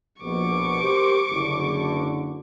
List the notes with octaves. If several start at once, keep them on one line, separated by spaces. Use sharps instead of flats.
A#1 B2 C#6 D6
G4 A#4 C5
F#1 D3